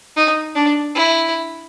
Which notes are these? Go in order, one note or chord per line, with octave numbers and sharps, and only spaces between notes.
D#4
D4
E4